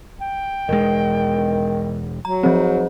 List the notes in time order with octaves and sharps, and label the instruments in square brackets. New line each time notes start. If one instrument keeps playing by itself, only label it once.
[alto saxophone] G5
[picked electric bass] E1 G#3 [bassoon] D#3
[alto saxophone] F#3 [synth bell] A#5
[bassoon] G#2 [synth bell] F3 C4